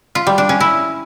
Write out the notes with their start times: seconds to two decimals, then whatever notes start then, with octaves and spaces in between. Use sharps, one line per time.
0.15 F4
0.27 G3
0.38 D4
0.49 C#4
0.61 E4